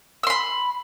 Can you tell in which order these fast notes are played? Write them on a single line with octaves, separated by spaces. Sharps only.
E6 C6 B5